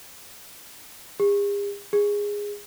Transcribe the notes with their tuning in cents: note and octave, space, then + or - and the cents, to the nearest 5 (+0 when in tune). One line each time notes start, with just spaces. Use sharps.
G#4 -45
G#4 -15